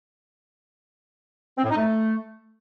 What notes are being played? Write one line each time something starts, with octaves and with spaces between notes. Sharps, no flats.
C4
A2
D#4
A3